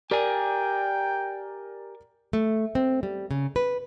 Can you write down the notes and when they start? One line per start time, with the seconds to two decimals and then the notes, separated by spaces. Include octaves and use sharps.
0.11 G4 A#4 D5 G5 G#5 A#5
2.33 A3
2.75 C4
3.03 G3
3.31 C#3
3.56 B4